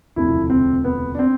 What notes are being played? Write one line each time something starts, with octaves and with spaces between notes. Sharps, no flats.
E1 D2 C3 F3 E4
C4
B3
D4
C4